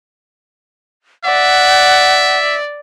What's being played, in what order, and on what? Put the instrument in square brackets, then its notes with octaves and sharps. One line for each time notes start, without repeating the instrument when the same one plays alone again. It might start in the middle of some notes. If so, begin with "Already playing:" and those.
[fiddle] D5 [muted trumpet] E5 [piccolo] F#5